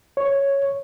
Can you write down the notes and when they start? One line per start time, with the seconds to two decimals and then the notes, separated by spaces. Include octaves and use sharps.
0.17 C#5